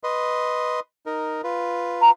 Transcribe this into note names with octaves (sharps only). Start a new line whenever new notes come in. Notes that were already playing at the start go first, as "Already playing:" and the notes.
B4 D#5 C6
D#4 A#4
F4 B4
A#5